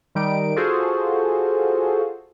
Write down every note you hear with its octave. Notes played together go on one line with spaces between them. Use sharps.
D#3 G3 D#4 D7
F4 F#4 G#4 A4 C5